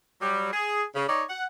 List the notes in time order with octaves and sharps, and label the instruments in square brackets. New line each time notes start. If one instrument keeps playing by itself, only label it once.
[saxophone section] F#3 G3
G#4
C#3
D#4 C#5 D5
F#5